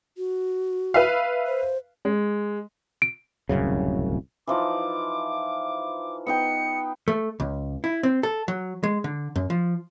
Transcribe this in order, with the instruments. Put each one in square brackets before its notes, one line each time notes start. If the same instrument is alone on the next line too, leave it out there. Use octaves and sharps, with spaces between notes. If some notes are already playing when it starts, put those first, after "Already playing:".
[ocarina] F#4
[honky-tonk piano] B4 E5 F5
[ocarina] C5
[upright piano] G#3
[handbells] D7
[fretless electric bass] D1 C2 F#2 C#3
[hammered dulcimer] E3 F3 D#4 [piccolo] D6
[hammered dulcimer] B3 D#4 G5 [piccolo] C#7
[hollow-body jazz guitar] A3
C#2
E4
C4
A4
F#3
G#3
D3
F#2
F3